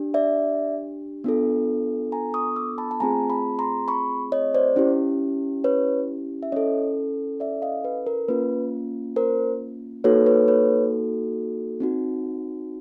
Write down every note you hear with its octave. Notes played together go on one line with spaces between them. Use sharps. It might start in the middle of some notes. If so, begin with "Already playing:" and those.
Already playing: D4 G4
D5 E5
B3 D4 F4 A4
G#5 A#5
C#6 D#6
D6 E6
A5 B5
A5
A3 C4 F4 G#4 G#5 A#5
A5 B5
A#5 C6
B5 C#6
C#5 D#5
C5 D5
C#4 E4 G4
B4 C#5
E5
C#4 E4 A4 C#5 D#5
D5 E5
D#5 F5
B4
A#4
A#3 C#4 F4 B4
A#4 C5
A#3 D#4 F#4 A4 B4 C#5
B4 C#5
B4 C#5
C4 D#4 F#4